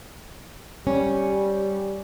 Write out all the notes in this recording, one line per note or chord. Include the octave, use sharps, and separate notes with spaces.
G3 C#4